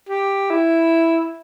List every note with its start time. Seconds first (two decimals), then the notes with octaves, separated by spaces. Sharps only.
0.09 G4
0.51 E4